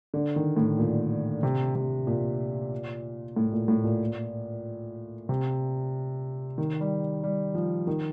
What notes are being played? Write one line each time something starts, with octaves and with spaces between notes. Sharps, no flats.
D3
D#3
A2
A#2
C3
C3
A#2
A2
A#2
A2
A#2
C3
D#3
G3
G3
F3
D#3